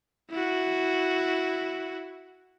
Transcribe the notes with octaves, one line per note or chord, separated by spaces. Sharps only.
E4 F#4